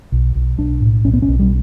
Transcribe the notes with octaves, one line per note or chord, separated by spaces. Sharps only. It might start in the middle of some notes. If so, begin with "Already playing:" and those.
B1
B1
B1 D4
A2
B1 C#4
B3
C#4
B1
G3